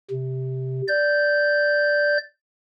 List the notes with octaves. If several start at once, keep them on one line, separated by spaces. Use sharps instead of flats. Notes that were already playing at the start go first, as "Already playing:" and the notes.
C3
D5 G6